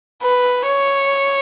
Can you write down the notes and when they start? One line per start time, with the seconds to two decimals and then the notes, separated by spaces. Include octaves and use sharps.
0.22 B4
0.66 C#5